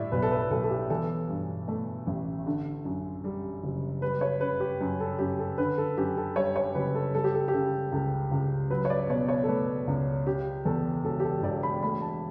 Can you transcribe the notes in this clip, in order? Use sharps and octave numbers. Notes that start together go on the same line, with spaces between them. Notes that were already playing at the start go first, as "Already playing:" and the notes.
Already playing: A2 G3 D5 E5
B1 B4
A4
B4
B1 A4
A4
G4
E3 A4
G2
A3
A1
D3
F#2
G3
F#1
G3 B4
C#5
C#3 B4
G4
F#2
A4
F#2 G4
A4
D3 B4
A4
F#2 G4
A4
G3 C#5
C#5
F#1 B4
A4
G3 A4
G4
A4
G4
C#3 A4
C#2 A4
C#2
F#3 B4
C#5
D5
B2 C#5
C#5
A4
A3 B4
C#2
C#3 G4
E2 A4
E1 A4
G4
A4
E1 D5
B5
A3 B5
A5